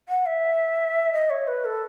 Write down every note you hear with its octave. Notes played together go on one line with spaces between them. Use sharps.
F#5
E5
D#5
C#5
B4
A4